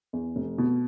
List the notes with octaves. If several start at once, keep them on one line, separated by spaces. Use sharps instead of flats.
E2
F1
B2